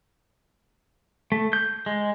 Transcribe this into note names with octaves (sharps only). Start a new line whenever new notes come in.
A3
G6
G#3